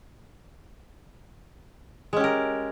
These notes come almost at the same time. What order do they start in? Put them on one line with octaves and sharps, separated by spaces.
G#3 C#4 G4 A#4